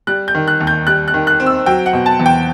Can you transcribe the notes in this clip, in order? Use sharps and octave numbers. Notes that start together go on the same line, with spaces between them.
G3 F#6
G6
D#3
F#6
D#2
G6
G3 F#6
F#6
D#3
F#6
C4
E6
F#3 G5
F#5
B2
A5
E2
G5